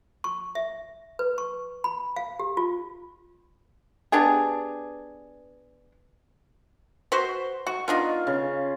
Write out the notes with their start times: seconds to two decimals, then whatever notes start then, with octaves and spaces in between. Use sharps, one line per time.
0.24 C#6
0.55 E5
1.19 B4
1.38 C#6
1.84 B5
2.16 F5
2.39 G4
2.57 F4
4.12 B3 D4 G4 G#4
7.12 F#4 B4 C5
7.67 F#4 C#6
7.88 B3 D4 D#4 F4
8.27 C#3